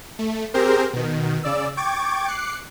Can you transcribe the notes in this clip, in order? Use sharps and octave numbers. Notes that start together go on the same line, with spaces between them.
A3
C4 G4 G#4 A#4 C5
B2 D#3
C#3 D5 E6
G5 C#6 D6 G#6 A6 D7
D6 F#6 C7 C#7